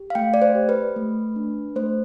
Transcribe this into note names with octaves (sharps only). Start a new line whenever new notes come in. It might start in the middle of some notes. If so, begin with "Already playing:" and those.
Already playing: G4
F5
A3 G5
D5
C5
G4
B4
A3
D4
A3 C5